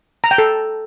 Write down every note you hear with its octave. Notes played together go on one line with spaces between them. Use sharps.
A#5
G5
A4